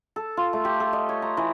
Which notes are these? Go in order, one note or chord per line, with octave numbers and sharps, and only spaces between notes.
A4
F4
A3
G4
A4
D#5
C#5
A#5
E3